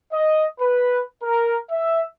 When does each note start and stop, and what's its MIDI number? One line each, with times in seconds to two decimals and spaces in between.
0.12 0.45 75
0.60 1.01 71
1.23 1.57 70
1.70 2.01 76